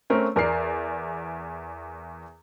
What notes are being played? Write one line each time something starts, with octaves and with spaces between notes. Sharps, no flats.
A3 C4 C#4 A#4
E2 A#4 D5 C7